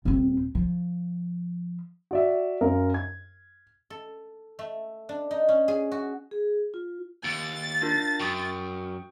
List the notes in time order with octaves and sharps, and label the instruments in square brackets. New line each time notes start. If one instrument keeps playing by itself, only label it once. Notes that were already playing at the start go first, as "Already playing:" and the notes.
[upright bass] D#1 C4
F3
[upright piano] F#4 D5 E5
F#2 A#4 F5
G#6
[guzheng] A4
A3
D4
D#4
C#4
G#4
F#4
[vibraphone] G#4
F4
[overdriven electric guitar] D#2 [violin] A6
[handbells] D4 F4 A#4
[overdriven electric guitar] F#2 [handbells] G5 C#6 D#6